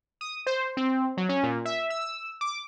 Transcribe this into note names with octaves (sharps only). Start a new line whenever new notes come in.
D#6
C5
C4
F#3
C#4
A#2
E5
E6
E6
D6